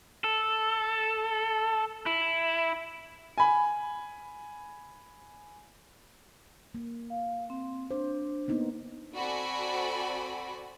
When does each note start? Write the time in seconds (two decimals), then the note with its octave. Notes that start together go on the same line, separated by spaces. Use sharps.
0.24 A4
2.06 E4
3.38 G#5 B5
6.75 A#3
7.10 F5
7.50 C4
7.91 D4 C5
8.48 A#3 B3 D#4
9.15 C4 F#4 A4 D5 G#5 B5